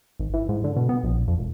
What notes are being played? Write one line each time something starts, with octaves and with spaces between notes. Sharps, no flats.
G#1
E3
G#2
D3
B2
B3
A#1
F2
E1